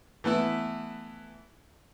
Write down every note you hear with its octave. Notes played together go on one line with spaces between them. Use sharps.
E3 A3 B3 E4